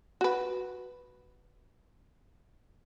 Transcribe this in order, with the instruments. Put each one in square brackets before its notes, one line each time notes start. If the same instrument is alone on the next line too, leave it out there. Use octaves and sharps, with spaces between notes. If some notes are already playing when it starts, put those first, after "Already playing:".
[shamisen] F#4 B4